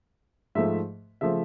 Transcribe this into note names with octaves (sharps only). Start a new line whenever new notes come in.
G#2 F3 A3 E5
C#3 F3 A3 E5